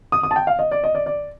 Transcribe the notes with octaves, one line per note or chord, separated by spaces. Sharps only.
D#6
D#6
A5
G5
F5
D#5
D5
D#5
D5
D5